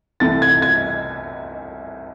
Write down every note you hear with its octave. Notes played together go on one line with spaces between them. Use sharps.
C2 C3 E3 A3 A6
G#6
G#6